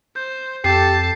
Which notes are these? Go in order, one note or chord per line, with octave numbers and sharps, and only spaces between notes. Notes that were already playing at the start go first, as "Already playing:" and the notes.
C5 G6
F2 G4 A4 A5 C7